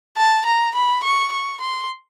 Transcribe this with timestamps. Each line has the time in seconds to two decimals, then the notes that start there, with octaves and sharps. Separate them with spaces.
0.17 A5
0.46 A#5
0.75 B5
1.03 C#6
1.32 C#6
1.60 C6